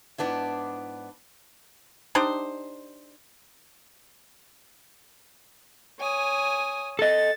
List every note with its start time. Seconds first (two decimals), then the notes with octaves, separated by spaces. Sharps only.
0.18 G#2 B3 D4 E4
2.15 D4 D#4 G4 C5
5.99 C#5 G#5 D#6
6.99 A4 D#5 A6